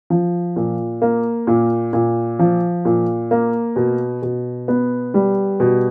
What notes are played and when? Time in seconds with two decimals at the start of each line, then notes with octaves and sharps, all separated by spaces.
0.10 F3
0.56 A#2
1.02 A#3
1.47 A#2
1.93 A#2
2.39 F3
2.85 A#2
3.31 A#3
3.76 B2
4.22 B2
4.68 B3
5.14 G3
5.60 B2